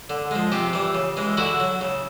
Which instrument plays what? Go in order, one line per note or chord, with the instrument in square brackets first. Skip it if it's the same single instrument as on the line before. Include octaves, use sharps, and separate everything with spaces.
[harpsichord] D3
F3 G#3
C3 F4 G4
E3 G3
C#3
E3 G#3
D3 E4 F#4
F#3
C#3